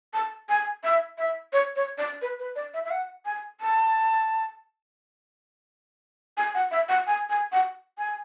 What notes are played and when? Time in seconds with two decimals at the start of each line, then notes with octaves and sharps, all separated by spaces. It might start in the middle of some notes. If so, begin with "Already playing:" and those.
0.14 A5
0.49 G#5
0.84 E5
1.18 E5
1.53 C#5
1.76 C#5
1.98 D5
2.22 B4
2.39 B4
2.56 D5
2.74 E5
2.85 E5
2.91 F#5
3.25 G#5
3.61 A5
6.37 G#5
6.55 F#5
6.71 E5
6.89 F#5
7.07 G#5
7.30 G#5
7.52 F#5
7.98 G#5